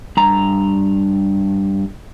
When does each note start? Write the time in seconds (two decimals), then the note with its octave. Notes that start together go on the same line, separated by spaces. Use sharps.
0.17 G2 A#5